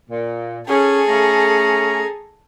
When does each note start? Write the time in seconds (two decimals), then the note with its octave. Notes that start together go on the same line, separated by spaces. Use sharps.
0.10 A#2
0.68 C#4 G#4 A4
1.08 A3 C#4 A#5